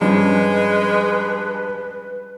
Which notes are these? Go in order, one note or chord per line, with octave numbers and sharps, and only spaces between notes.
G2 F3 G#3 C#4 B4